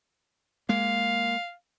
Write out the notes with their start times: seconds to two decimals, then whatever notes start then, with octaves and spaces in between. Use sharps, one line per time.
0.69 G#3 A#3 F5